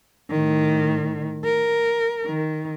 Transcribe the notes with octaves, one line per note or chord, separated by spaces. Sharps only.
A2 D#3
A#4
D#3